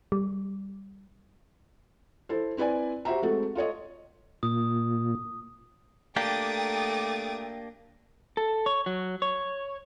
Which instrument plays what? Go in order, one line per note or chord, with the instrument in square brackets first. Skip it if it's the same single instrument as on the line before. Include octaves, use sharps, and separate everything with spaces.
[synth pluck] G3
[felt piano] E4 A4 C5
C4 E4 B4 D5 G#5
F#4 G4 C5 E5 A#5
G#3 A3 C4 F#4 A4
F4 A4 C#5 D#5
[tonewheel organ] A#2 [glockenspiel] D#6
[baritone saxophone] A3 [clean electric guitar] A#3 D4 G4 [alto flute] G5 [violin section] D6 D#6 A6
[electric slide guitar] A4
C#5
F#3
C#5